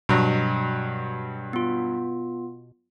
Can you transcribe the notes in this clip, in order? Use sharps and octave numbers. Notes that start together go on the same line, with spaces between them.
G2 B2 F#3
B3 F4